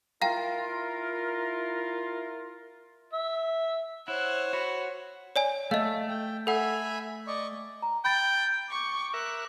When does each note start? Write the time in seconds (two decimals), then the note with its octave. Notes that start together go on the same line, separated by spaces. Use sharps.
0.22 E4 F4 A#4 F5 G5 A#5
3.13 E5
4.08 E4 C5 C#5 F#5
4.53 F#4 B5
5.36 C#5 D5 G#5
5.71 A3 D#5 F5
6.09 G5
6.47 A4 E5 F#5 G#5 B5
7.27 D5 D#5 C#6
7.82 A#5
8.05 G5 B5 G6 A6
8.70 C#6 D6
9.14 A#4 E5 F#6